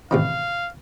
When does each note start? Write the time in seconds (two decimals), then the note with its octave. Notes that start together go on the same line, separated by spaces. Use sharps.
0.11 A1 C3 D#3 F5